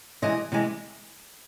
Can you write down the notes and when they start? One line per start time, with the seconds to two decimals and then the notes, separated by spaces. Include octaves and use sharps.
0.22 C3 E3 G#3 D#5
0.52 C3 E3 G#3